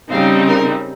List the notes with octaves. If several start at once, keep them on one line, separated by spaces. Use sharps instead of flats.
C#3 G3 C4 D#4 F5
A#4